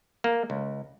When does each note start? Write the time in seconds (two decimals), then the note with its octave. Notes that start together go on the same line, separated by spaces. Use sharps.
0.24 A#3
0.50 C#2